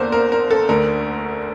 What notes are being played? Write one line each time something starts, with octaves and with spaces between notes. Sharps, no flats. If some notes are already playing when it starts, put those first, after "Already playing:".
Already playing: E2 D3 A#3 D4 A#4 C5
A#4
A#4
A4
D2 D3 A3 A#4